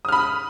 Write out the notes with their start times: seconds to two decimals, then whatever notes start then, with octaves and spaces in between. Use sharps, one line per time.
0.05 D#6
0.09 F6
0.12 B5